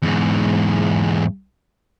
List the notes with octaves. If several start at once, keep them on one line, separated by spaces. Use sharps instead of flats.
E2 G#2